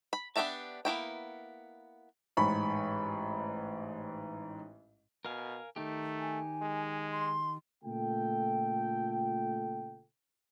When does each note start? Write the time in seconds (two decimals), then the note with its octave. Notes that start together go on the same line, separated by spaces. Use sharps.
0.13 B5
0.36 B3 D4 G4 E5 A5
0.85 A#3 B3 E4 G5
2.37 A1 G#2 B5 C#6
5.25 B2 A#4 F5 G#5
5.76 D#3 A3 D#4 G4
6.20 G#5
6.62 G#3
7.11 C6
7.84 A#2 C#3 A3 F4 A4 G5